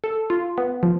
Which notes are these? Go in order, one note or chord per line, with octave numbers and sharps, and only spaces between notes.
A4
F4
B3
F3